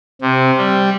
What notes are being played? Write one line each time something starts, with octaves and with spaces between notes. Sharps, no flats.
C3
G3